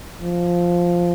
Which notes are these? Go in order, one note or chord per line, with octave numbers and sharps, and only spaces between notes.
F3